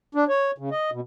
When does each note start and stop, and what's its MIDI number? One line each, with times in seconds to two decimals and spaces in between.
0.15 0.24 62
0.28 0.51 73
0.58 0.70 49
0.71 0.90 75
0.92 1.00 47